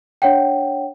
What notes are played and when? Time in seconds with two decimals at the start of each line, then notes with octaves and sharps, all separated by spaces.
0.22 D4 C#5 F#5 G5